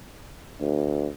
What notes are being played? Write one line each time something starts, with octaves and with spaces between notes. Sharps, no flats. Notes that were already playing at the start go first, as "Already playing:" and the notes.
D2